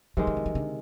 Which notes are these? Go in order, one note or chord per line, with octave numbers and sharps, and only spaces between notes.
C3 D#3 F#3 G#3
E3
F3
E3
D3